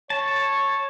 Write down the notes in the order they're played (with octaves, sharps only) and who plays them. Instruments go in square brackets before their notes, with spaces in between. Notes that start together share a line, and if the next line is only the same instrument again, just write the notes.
[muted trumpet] C#5 [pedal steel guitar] A5